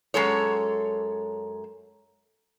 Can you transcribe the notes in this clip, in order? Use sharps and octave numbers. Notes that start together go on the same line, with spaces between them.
F#2 G#3 A4 C#5